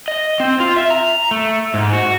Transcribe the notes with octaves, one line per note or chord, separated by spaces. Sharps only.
D#5
C4
F4
E5
A#5
A3
G#2
F#4